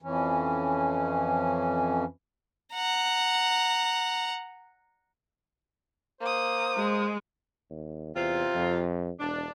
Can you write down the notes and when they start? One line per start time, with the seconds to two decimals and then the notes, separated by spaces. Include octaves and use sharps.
0.02 F2 E3 C#4
2.74 F#5 A#5
6.21 A#3 C5 D#6
6.77 G#3
7.70 D#2
8.16 E2 C3 C4 F4
8.55 F2
9.19 E1 D4